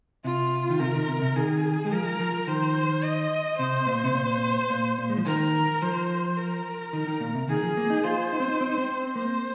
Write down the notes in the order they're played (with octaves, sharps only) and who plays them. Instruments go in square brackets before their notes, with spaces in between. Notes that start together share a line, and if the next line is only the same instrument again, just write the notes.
[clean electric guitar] C3 [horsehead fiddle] F4
[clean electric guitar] D#3
[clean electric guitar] C3 [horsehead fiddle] A#4
[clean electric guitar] D#3
C3
C3
[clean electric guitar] D#3 [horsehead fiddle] G#4
[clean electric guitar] G#3
[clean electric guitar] F3 [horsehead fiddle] A#4
[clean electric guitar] F3
[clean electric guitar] D#3 [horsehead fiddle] C5
[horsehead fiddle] D#5
[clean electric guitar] C3 [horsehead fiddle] C5
[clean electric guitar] A#2
C3
A#2
A#2
A#2
G#3
F3
[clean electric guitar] D#3 [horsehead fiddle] A#4
[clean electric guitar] F3 [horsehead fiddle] C5
[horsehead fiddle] A#4
[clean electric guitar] D#3
D#3
A#2
C3
[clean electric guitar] D#3 [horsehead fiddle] G#4
[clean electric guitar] F3
A#3
D#4
[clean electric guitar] F4 [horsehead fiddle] C5
[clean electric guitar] D#4
C4
D#4
C4
D#4
C4
[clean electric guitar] A#3 [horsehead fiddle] C5